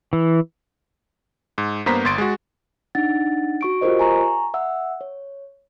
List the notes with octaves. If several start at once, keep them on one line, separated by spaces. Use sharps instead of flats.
E3
G#2
G2 A#3 B3 C5 A#5 B6
G1 C6 A6 D7
G#3 F#4
D4 D#4 F#5 A6
F#4 C#6 D7
F4 G4 A#4 C5 D#5
G#5 A#5 C#6
E5 F#5 E6
C#5